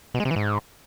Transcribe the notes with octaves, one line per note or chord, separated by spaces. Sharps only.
B2
G#3
C3
E3
G#2